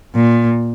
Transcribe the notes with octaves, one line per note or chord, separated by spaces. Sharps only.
A#2